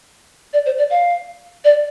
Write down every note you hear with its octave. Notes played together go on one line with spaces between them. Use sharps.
D5
C5
D5
F5
D5